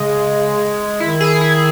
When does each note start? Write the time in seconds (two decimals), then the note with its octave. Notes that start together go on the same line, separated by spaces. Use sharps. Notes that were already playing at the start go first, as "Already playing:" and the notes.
Already playing: C#3 G#3
1.00 D#3 E4
1.21 G#4
1.41 E4